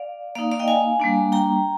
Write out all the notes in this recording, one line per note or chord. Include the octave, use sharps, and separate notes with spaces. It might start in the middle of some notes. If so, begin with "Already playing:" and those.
Already playing: D5 F5
A#3 D#4 D5 F5
D5 F5
D#5 G5
F5 G#5
G3 A#3 D4
G5 A#5